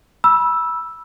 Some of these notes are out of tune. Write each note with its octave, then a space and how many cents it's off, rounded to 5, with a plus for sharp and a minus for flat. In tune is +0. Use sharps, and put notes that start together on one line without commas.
B5 -25 E6 +0